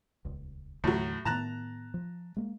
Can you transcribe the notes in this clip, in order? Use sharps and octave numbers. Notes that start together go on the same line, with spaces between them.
D#1 C#2
D#2 A2 D3 E3 F#3
A2 D#3 B3 A5 A#5 F#6
F3
G#3 A#3